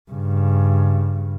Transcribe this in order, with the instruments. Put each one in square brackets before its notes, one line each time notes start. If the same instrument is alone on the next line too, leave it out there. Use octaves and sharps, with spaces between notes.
[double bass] G2 C#3